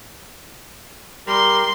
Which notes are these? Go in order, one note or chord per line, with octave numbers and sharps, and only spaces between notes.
G3 G4 A#4 C6